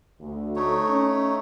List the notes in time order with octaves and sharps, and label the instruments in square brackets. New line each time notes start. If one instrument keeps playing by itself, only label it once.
[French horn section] D2
[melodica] A3 D#4 C#5
[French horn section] C#4